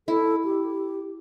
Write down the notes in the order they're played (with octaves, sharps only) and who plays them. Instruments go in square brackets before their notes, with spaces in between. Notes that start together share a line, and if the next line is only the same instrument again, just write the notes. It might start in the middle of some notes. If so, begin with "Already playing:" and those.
[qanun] E4 [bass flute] A4
[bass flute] G4